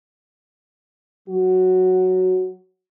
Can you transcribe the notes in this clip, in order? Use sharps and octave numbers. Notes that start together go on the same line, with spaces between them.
F#3 F#4